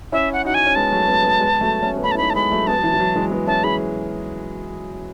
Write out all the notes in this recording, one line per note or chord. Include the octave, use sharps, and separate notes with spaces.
C#4 E4 E5
F#5
D#4 F#4 F#5
G#5
C#4
G#3 B3 A5
F#3 A3
G#3 B3
G#3 B3
G#3 B3
F#3 A3
A3 C#4
B3
A3 C#4 B5
A5
E4
B3 D#4 B5
A5
G#3 B3 B5
F#3 A3
G#3 B3 A5
F#3
E3
E3
F#3
E3 G#3
G#3 B3
C#4 E4 A5
E4 G#4 B5